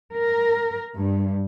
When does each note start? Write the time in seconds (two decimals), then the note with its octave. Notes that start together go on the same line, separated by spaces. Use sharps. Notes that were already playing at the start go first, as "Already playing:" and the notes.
0.15 A#4
0.95 G2